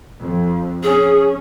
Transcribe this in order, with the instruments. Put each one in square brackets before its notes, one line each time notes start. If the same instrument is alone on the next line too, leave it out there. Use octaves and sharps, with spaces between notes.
[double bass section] F2
[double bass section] C#4 [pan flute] G#4